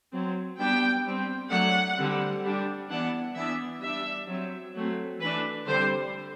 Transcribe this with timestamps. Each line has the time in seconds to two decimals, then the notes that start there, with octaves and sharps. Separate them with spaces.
0.13 F#3 C4
0.59 G3 B3 D4 G5
1.05 G3 C4
1.50 F#3 A3 D4 F#5
1.98 D3 G3 C4
2.44 G3 D4
2.89 E3 B3 D4 F#5
3.35 E3 B3 D4 E5
3.82 G3 D4 E5
4.27 F#3 C4
4.74 F#3 A3 C4
5.20 E3 A3 D4 B4
5.66 D3 G3 C4 C5